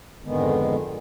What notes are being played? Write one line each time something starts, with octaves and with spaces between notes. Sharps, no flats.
F2 G#2 D3 D#3 G#3 B3